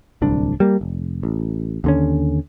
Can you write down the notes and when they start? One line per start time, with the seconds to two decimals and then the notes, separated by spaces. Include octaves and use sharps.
0.22 D1 C2 D4
0.60 G3 A#3
0.81 F1
1.23 A1
1.84 D#2 D3 C#4